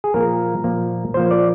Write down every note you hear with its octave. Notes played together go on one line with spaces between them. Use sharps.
G#4
A#2 F3 A#3 A#4
A#2 F3 A#3
A#2 F3 A#3 C5
D5